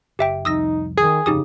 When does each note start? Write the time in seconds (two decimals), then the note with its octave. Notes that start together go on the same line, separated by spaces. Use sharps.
0.19 F#1 G4 E5 G5
0.45 C2 F2 D#4 D#6 E6 A#6
0.97 D#3 G#4
1.26 G1 F2 C#3 D#4 G4 D#6